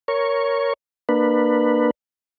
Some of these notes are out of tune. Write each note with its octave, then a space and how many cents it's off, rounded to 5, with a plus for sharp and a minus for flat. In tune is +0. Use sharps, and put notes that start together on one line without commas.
A#4 +0 C#5 +10 C#6 -10
A#3 +0 D4 +30 B4 +0